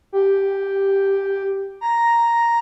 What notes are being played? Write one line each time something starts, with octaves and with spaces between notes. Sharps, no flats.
G4
A#5